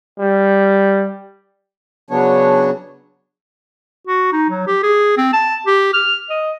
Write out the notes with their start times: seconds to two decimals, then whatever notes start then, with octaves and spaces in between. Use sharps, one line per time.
0.19 G3
2.10 C#3 F#3 B3 D4 C#5
4.07 F#4
4.33 D#4
4.50 F#3
4.67 G4
4.83 G#4
5.17 C4
5.33 A5
5.67 G4
5.94 F6
6.30 D#5